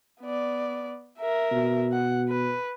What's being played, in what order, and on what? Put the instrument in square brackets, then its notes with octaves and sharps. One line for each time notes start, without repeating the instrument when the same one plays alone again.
[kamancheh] B3 D5
A#4 E5
[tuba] B2
[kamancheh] F#5
B4